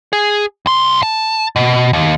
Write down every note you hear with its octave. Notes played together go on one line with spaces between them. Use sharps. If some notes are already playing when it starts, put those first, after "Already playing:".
G#4
B1 C6
A5
B2
D#2